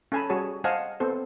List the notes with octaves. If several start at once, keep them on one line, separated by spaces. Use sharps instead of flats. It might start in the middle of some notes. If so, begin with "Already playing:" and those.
C#4 A4 G#5 A5 B5
G3 F#4 G#4 C#5 A5
C5 D#5 F5 F#5 G#5 A5
B3 C4 A4 C5